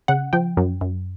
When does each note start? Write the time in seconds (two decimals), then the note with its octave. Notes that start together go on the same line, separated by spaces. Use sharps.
0.08 C#3 F#5
0.33 F3 G5
0.57 F#2
0.81 F#2